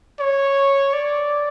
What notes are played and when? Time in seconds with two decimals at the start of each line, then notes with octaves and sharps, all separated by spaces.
0.20 C#5
0.93 D5